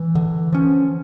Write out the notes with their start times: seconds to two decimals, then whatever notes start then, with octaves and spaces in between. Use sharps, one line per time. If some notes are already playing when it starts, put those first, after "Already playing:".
Already playing: E3
0.15 D3
0.53 F3 C#4